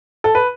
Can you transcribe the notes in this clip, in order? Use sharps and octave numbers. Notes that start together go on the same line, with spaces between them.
A4
B4